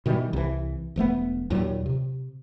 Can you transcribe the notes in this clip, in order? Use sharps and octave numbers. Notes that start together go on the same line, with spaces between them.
B2 D#3 E3 G3
C2 E3
E1 F3 A3 B3
D#2 A#2 F#3 G3
C3